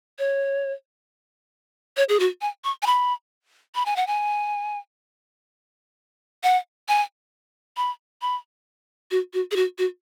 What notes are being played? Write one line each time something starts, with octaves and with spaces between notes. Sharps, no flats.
C#5
C#5
G#4
F#4
G#5
C#6
G#5
B5
B5
G#5
F#5
G#5
F#5
G#5
B5
B5
F#4
F#4
G#4
F#4
F#4